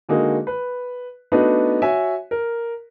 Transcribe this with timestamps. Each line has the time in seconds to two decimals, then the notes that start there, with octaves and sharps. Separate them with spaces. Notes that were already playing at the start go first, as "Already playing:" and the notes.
0.09 D3 G#3 A#3 D#4 F#4 G#4
0.47 B4
1.32 A3 B3 D4 D#4 F#4 B4
1.82 F#4 C#5 E5 G#5
2.31 A#4